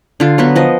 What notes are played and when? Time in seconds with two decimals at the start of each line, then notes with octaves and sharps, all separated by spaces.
0.20 D3 F4
0.38 F#3 B3 B4
0.56 F3 D#5